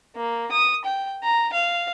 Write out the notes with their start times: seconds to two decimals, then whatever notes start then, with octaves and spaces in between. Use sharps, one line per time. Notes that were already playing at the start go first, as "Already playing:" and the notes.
0.16 A#3
0.52 D#6
0.85 G5
1.24 A#5
1.53 F5